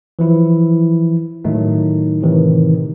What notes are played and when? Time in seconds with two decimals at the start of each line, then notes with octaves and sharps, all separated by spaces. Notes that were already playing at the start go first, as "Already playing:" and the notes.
0.19 E3 F3 E4
1.45 A2 D#3 F#3 A3 D#4
2.22 A2 C3 D#3 E3